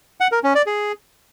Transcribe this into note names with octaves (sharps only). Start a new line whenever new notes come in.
F#5
A#4
C#4
D5
G#4